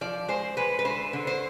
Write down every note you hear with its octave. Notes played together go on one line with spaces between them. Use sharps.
F3 D5
G#3 C5
G#3 B4
B4
D3 C5
D3
C5